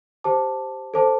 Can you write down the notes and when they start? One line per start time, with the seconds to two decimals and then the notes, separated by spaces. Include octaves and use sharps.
0.24 G4 C5 A5 D6
0.94 A4 C5 A5 D6